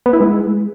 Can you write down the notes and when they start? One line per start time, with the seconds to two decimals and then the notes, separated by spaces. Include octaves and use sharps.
0.06 B3
0.13 E4
0.20 G#3